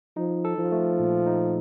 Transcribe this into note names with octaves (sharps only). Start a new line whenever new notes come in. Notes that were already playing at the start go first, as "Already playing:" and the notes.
F3 D#4
A4
F3
A3
A#2
D#4